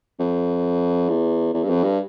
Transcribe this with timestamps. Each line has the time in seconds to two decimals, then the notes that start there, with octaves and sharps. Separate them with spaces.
0.20 F2
1.09 E2
1.54 E2
1.63 G2
1.69 F2
1.83 G2